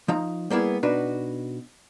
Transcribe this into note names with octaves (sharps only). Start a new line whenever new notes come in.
F3 D#4 A#5
G3 A#3 B3 E4 G#4
B2 D4 D#4 F#4 B4